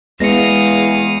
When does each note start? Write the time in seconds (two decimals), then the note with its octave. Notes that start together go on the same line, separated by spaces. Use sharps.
0.20 E2 G#3 B3 D#5 F5 D#6 A#6 C#7